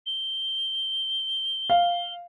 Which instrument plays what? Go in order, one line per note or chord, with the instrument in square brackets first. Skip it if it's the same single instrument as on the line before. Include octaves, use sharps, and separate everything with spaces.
[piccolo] G7
[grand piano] F5